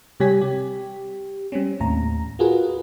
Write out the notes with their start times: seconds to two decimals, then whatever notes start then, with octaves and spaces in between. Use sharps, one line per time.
0.20 C3 G3 G4 C#5 G#5 B6
0.41 G4
1.52 G3 C4 C#4
1.80 D#2 A2 A#5
2.39 F4 F#4 G#4 A#4 B4